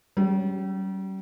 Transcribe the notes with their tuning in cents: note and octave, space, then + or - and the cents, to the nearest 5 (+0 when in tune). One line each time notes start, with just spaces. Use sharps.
G3 -40 C#4 +5